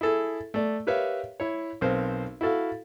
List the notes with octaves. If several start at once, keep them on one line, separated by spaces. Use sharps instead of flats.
E4 G#4 A4 E5
A3 D5
G4 A#4 B4 C#5 E5 F5
E4 C#5
B1 C4 A#4 C5 F5
E4 F#4 A4 F5